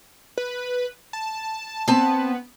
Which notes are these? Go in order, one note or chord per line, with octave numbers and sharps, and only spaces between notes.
B4
A5
B3 C4 A5